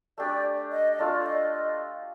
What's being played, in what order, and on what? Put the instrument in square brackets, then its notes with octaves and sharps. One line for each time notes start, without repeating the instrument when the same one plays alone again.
[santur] A3 D4 G4 [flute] D5
[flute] D#5
D#5
[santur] A3 D4 F4 A4 [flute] D5
[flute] D#5
D#5